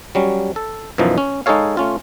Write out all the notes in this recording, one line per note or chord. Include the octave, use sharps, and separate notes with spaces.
F#3 G3 C#4
A4
F#2 B2 E3 F3 D#4
C#4
G#3 D#4 G#4 A4 C#5 F5
A3 C#4 F4